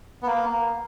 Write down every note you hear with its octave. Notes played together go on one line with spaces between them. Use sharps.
B3
A#3